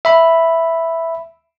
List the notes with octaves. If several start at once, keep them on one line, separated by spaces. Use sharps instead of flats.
E5 B5